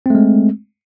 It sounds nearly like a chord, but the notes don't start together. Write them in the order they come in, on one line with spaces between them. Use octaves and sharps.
C4 A3 G#3